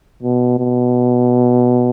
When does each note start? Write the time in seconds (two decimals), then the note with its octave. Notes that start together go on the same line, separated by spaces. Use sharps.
0.23 B2
0.58 B2